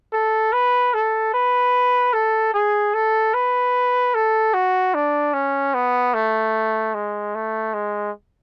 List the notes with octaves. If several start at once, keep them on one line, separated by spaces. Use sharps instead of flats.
A4
B4
A4
B4
A4
G#4
A4
B4
A4
F#4
D4
C#4
B3
A3
G#3
A3
G#3